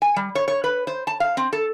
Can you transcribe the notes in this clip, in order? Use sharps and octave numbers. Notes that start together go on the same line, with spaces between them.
G#5
G3
C#5
C#5
B4
C5
A5
F5
C4
A4